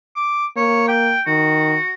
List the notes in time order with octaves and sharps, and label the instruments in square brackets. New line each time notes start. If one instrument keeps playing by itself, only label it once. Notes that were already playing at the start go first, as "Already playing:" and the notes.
[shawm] D6
[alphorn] A#3 [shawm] C#5
[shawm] G5
[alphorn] D#3 [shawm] F#4